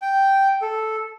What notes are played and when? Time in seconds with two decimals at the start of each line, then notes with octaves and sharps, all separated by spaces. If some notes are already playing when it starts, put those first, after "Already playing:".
0.02 G5
0.62 A4